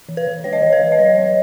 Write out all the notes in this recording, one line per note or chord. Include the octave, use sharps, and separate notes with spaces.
E3
B4
E3
G#3 C#5
D#5
E3 C#5
B4
E3
D#5
F#3 C#5
F#3